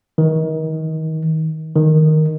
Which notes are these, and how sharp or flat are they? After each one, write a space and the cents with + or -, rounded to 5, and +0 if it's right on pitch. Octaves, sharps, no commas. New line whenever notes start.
D#3 +30
D#3 +0